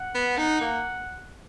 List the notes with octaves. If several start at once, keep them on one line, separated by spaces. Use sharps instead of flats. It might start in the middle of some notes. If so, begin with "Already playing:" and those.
Already playing: F#5
B3
D#4
A#3